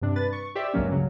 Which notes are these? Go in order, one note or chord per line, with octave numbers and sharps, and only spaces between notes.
G2 C3 D4
B4 A6
C#6
G4 C5 D5 E5
C#2 G2 B2 F#3 A#3 C#4
C#3 F#3